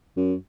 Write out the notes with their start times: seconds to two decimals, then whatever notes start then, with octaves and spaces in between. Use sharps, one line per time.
0.17 F#2